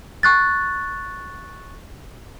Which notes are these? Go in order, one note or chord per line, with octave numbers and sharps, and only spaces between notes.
C#6 F#6 A6